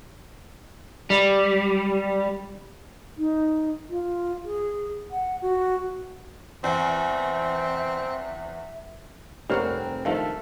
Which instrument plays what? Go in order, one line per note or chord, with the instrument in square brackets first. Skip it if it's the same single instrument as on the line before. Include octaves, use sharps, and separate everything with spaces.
[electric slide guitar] G3
[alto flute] D#4
F4
G#4
F#5
F#4
[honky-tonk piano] E2 [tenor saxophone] C4 [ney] E5
[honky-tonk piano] F1 G4 A#4 [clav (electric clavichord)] G3 C#5 F#5 [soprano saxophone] C4 [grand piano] F6
[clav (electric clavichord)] G2 D#3 F3 [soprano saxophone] A3 [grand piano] A4 F5